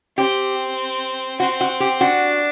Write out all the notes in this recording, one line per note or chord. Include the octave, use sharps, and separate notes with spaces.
C4 G4
C4 F#4
F#4
G4
D4 F#4